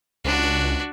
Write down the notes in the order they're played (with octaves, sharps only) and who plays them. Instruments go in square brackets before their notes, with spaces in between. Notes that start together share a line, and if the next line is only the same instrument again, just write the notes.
[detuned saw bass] C#2 [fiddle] D4 F#4